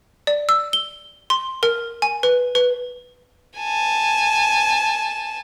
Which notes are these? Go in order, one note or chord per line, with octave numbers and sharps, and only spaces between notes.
D5
E6
G7
C6
A#4
G#5
B4
B4
G#5 A5